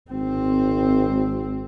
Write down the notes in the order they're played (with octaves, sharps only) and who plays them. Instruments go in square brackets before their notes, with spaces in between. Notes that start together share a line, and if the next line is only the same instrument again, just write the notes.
[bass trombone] G#1 [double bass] C4